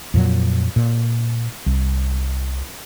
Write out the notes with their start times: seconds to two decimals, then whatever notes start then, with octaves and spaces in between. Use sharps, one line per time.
0.14 F2 A#2 F#3
0.76 A#2
1.66 C2